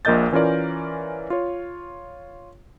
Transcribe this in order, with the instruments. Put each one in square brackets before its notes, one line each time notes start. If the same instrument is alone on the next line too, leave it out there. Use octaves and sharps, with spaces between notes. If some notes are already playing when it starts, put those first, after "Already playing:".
[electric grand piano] A#1 A#2 A#4 D#5 G6 A6
E3 C#4 F4 A#4 D5
F4 C#5